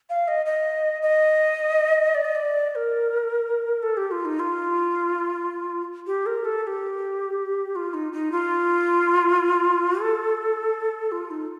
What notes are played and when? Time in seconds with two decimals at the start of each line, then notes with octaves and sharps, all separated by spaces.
0.10 F5
0.28 D#5
0.46 D#5
1.02 D#5
2.14 D5
2.25 D#5
2.35 D5
2.70 D5
2.75 A#4
3.82 A4
3.97 G4
4.11 F4
4.25 D#4
4.39 F4
6.07 G4
6.26 A#4
6.45 A4
6.63 A4
6.67 G4
7.76 F4
7.94 D#4
8.13 D#4
8.32 F4
10.00 A4
11.12 F4
11.30 D#4